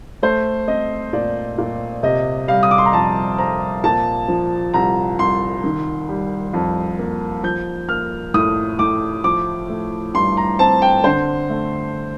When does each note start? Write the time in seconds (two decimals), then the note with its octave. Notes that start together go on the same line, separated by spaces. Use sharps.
0.23 A3 C5
0.68 C4 D#5
1.13 A#2 D5
1.58 A#2
2.03 C3 D#5
2.48 G3 F5
2.63 D#6
2.71 D6
2.78 C6
2.85 A#5
2.93 F2 A5
3.38 C4 A#5
3.84 A#2 A5
4.28 F3
4.74 C2 A#5
5.19 C2 C6
5.64 D#3
6.09 G3
6.53 F2
6.99 A#3
7.43 F3 G6
7.89 A#3 F6
8.34 A2 D#6
8.79 A2 D6
9.24 F3 D6
9.69 A3
10.14 G2 C6
10.37 A#5
10.59 C4 A5
10.82 G5
11.04 D3 C5
11.50 A3